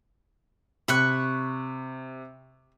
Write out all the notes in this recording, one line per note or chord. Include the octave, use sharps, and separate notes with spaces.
C3 B5 C#6 F#6